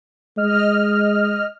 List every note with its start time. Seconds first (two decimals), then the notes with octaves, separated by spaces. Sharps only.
0.37 G#3 D#5 F6